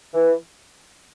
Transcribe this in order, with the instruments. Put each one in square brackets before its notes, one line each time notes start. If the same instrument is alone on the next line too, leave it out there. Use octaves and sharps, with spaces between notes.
[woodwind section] E3